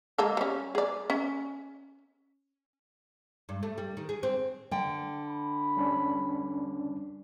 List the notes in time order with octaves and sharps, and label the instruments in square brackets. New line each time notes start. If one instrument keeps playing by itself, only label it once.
[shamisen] G#3 A#3 A4
G3 C#4
G#4 D5
C#4
[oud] G2
A3
G3
D#3
G#4
C4
[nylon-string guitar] D3 G5
[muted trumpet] B5
[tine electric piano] G3 C#4 D4